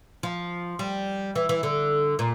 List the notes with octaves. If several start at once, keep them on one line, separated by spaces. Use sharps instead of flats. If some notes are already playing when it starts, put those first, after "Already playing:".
F3
G3
E3
E3
D3
A#2